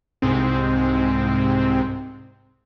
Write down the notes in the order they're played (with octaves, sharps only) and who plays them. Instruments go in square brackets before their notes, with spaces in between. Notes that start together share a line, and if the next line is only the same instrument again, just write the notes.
[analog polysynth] C2 G#2 C3 G#3 C4